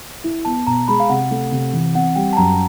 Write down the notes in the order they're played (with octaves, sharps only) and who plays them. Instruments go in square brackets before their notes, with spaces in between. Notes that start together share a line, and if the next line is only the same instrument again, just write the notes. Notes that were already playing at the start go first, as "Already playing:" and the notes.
[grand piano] E4
[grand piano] B3 [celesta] A5
[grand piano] B2 [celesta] A#5
[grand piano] G#3 [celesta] B5
[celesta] F5
[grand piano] C3 [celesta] F#5
[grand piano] A3
C3
E3
[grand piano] C4 [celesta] F#5
[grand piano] G3 [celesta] G5
[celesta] A5
[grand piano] F#2 [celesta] A#5